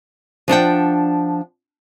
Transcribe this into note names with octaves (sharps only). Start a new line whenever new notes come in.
F3 D4 F#5 G5